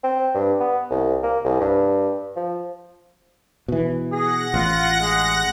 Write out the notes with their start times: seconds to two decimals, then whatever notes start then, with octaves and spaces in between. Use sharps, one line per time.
0.04 C4
0.35 G2
0.60 B3
0.90 C2
1.23 A#3
1.44 C2
1.61 G2
2.36 F3
3.68 B2 E3
4.12 G#4 F#5 A#6
4.54 A1 F4
5.01 G#3